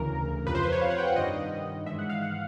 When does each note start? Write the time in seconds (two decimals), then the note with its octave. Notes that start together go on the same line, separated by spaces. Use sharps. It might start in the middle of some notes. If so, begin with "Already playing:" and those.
Already playing: D2 C#3 E3 A#4
0.45 F2 C3 F3 B4
0.55 C5
0.63 B4
0.72 C#5
0.81 F5
0.90 F#5
0.98 G5
1.07 F#5
1.16 G2 D#3 G3 D#5
1.86 G#2 E3 G#3 E5
1.99 F#5
2.09 F5
2.22 F#5